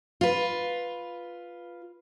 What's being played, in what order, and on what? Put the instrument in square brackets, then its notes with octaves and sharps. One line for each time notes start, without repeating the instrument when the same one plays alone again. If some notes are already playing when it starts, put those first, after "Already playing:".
[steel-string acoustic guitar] F4 B4